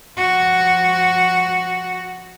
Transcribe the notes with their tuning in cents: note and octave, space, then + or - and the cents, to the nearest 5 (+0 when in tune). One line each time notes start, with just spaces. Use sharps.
F3 +0 F#4 +0